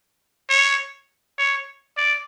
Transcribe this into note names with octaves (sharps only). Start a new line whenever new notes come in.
C#5
C#5
D5